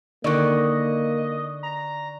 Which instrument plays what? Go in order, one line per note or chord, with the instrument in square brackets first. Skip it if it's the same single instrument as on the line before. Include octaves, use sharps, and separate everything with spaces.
[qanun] D3 D#3 [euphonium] A#3 [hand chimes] D5 C#6 F#6 [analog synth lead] D#5
[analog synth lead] A#5